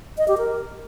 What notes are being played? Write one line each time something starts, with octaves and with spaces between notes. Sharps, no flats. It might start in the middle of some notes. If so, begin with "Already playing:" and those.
D#5
G4
A#4